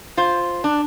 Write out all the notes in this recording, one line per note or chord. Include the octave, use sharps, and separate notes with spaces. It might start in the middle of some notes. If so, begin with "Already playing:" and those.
F4 C5
D4